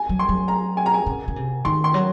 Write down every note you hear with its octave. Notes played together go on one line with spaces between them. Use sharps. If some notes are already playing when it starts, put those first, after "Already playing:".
Already playing: G#5
F#3
C6
F#3
A#5
G#5
A#5
G#5
C#3
C#3
C3
D#3 C6
C6
F#3